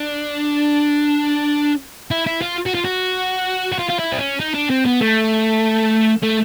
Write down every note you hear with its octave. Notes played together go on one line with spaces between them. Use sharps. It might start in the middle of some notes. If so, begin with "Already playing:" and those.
Already playing: D4
E4
E4
F4
F#4
F4
F#4
F#4
F4
F4
E4
C4
C#4
D#4
D4
C4
B3
A3
A3